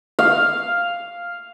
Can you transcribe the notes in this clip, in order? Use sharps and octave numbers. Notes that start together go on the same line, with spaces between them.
F5